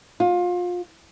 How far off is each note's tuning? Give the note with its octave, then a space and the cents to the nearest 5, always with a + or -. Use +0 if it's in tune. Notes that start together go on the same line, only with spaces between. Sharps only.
F4 +25